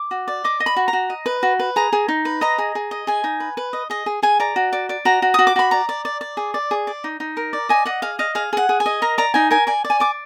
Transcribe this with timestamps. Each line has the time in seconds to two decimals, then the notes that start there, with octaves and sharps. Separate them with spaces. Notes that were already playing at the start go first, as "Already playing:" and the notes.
Already playing: D6
0.11 F#4
0.28 D5
0.44 D#5 D6
0.60 D#5
0.66 B5
0.76 F#4
0.88 A#5
0.93 F#4
1.10 D#5
1.26 B4
1.43 F#4
1.59 B4
1.76 G#4 A#5
1.93 G#4
2.08 D#4
2.25 B4
2.41 D#5 A#5
2.58 G#4
2.75 G#4
2.91 D#5
3.07 G#4 G#5
3.24 D#4
3.40 B4
3.57 B4
3.73 D#5
3.90 G#4 D#5
4.06 G#4
4.23 G#4 G#5
4.40 D5 A#5
4.56 F#4
4.73 D5
4.89 D5
5.05 F#4 A#5
5.22 F#4
5.34 F#4 D#6
5.47 D6
5.56 F#4 B5
5.71 D5 A#5
5.89 D5
6.05 D5
6.21 D5
6.37 G#4
6.54 D5
6.71 G#4
6.87 D5
7.04 D#4
7.20 D#4
7.37 A#4
7.53 D5
7.69 D#5 G#5
7.85 D#5 F#5
8.02 G#4 F5
8.19 D#5 F5
8.35 G#4 F5
8.53 G#4 F#5
8.69 G#4
8.80 G#5
8.86 D#5
9.02 A#4 A#5
9.18 D5 A#5
9.34 D#4 G#5
9.51 A#4 G#5
9.67 D5 G#5
9.85 D5
9.90 G#5
10.00 D5 D6